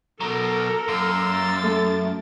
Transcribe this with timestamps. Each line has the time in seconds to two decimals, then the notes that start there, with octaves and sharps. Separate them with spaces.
0.20 B2 F#3 A4 A#4 A#5
0.88 F#2 A#3 C6 E6
1.27 A6
1.63 A3